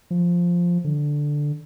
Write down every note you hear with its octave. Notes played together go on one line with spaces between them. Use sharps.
F3
D3